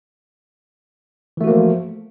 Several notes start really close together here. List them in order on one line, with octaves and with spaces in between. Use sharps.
E3 A3 F#4 A#3 F3